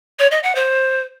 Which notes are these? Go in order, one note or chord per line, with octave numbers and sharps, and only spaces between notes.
C#5
D#5
F#5
C5